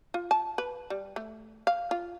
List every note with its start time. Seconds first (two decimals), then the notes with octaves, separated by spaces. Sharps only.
0.14 F4
0.31 A5
0.58 B4
0.90 G3
1.16 A3
1.67 F5
1.91 F4